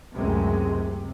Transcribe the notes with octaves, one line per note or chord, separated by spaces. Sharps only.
C#2 F#2 A2 C3 G#3
C3